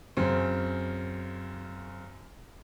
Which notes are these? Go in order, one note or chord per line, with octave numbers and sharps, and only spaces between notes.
F#2 C#3 C4